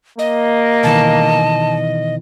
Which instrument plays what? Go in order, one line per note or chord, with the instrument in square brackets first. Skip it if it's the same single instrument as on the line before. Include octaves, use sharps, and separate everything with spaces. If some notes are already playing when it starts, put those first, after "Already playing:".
[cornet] A#3 [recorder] D#5
[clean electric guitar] B2 D#3 E3 [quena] A5